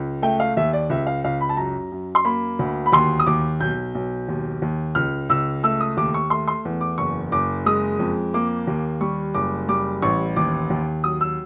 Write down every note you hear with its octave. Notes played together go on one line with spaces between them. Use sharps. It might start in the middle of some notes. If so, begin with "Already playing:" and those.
Already playing: C#2
A3 G5
F5
D#2 E5
D5
C#2 E5
F5
C#2 F5
B5
A5
F#2 A#5
F#2
C6
A#3 B5
D2
B5
D#2 C6
D#6
D#2 D6
B1 G6
B1
D#2
D#2
C#2 F6
C#2 E6
A3 E6
D#6
D#2 D6
C#6
A3 C6
C6
E2
D6
F#1 C#6
F#1 D6
G#3 D#6
F2
A#3 D6
D#2
G3 C#6
F#1 D6
G3 D6
A1 C#6
D#2 D6
D#2
F#3 D#6
E6